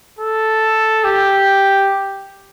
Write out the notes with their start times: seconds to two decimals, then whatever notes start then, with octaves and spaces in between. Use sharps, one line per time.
0.19 A4
1.04 G4